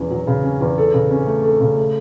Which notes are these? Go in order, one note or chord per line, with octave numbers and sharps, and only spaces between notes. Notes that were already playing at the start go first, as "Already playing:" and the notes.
Already playing: E2 F#3 C#4
F#3
C#3
C#4
E2
A4
C#3
C#4
A3
A4
C#3
A3